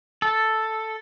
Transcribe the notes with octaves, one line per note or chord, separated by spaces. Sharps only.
A4